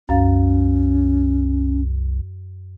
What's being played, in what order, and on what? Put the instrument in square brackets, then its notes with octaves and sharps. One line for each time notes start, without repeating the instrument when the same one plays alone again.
[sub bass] C2 [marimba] F#2 F5 A6 [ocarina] C#4